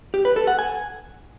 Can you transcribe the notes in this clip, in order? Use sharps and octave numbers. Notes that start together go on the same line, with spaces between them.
G4
B4
A4
F#5
G#5